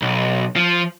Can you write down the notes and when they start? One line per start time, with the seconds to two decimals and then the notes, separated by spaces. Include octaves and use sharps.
0.02 B1
0.56 F3